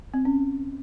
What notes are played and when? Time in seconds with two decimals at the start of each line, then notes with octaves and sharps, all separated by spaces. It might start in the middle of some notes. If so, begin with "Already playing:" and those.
0.14 C4
0.25 C#4